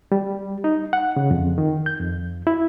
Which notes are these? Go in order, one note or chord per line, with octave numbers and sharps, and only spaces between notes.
G3
D#4
F#5
C#3
F2
D#3
G6
F2
E4